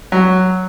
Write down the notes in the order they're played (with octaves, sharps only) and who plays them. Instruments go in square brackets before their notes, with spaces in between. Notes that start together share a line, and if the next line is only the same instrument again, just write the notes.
[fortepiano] F#3